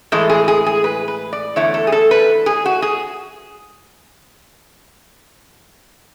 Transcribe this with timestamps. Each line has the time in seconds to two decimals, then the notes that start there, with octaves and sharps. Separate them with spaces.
0.12 A2 E3 G#3 A4
0.30 G#4
0.48 G#4
0.66 G#4
0.84 B4
1.08 B4
1.33 D5
1.56 E2 D3 A3 E4 C#5
1.74 A4
1.87 G#4
1.92 A4
2.11 B4
2.46 G#4
2.66 F#4
2.82 G#4